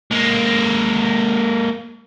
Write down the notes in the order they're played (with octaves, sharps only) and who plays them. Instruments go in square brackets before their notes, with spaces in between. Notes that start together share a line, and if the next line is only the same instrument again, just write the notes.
[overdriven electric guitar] G#3 A#3